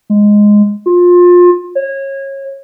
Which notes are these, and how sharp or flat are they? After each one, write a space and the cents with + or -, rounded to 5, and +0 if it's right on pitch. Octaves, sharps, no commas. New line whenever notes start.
G#3 -5
F4 +25
C#5 -25